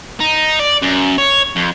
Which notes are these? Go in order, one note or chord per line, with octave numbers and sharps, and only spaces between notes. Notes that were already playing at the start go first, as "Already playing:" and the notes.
D#4
D5
F#2
C#5
F2